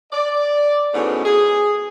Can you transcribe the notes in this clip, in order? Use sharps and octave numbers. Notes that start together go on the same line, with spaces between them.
D5
G#2 B2 E3 A3 B3 C#4
G#4